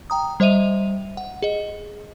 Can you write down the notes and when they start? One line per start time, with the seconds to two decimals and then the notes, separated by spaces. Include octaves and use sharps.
0.10 G5 A#5 D#6
0.40 G3 C5 D#5 E5 D#7 F7
1.17 F#5
1.42 G#4 D#5